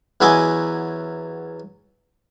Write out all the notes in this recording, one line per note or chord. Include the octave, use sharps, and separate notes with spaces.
E2 F#3 E4 D#5 G#5 D6